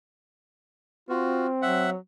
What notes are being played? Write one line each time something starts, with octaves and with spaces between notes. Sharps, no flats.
C4 F4 F#4
F#3 E5 F#5